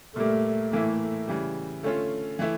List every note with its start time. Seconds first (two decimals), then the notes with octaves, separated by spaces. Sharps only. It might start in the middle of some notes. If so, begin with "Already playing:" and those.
0.16 A#2 G3 A3 A#3
0.72 A2 E3 A3 A#3 E4
1.27 C#3 E3 G3
1.83 D3 A3 C#4 F4
2.39 E3 A3 E4